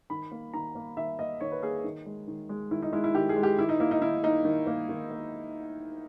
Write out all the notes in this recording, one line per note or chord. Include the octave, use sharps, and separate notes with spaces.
D#3 B5
A#3
D#3 A#5
A#3
D#3 E5
A#3 D#5
D#3 C#5
B4
A#3 G#4
D#3
G#3
D#3
G#3
D#3 E4
D#4
G#3 E4
E4
D#3 G4
G#4
G#3
G4
D#3 E4
D#4
A#3 E4
D#4
D#3 E4
A#3 D#4
D#3
A#3
D#3
A#3